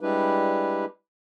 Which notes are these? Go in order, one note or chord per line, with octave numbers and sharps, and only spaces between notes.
G3 G#3 D4 E4 G4 B4